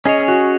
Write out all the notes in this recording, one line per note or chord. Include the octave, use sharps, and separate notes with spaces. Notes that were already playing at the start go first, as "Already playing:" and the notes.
C#4 G#4 C#5 D#5
F#4